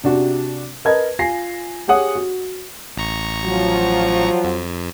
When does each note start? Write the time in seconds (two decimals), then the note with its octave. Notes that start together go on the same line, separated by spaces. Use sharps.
0.04 C3 D4 F#4
0.85 A#4 B4 D#5 A5 G#6
1.19 F4 G#5 A#6 C7
1.88 G4 G#4 C#5 F#5 D#6
2.15 F#4
2.97 A1 A#5 C#6
3.44 F3 F#3
4.44 F2